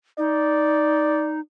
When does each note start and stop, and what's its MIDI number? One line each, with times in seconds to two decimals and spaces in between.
0.18 1.40 63
0.18 1.39 74